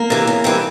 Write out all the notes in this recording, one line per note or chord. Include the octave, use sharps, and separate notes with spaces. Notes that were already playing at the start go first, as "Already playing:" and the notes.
Already playing: A#3 A#4
C3 E3
C#3
E3 G3 C4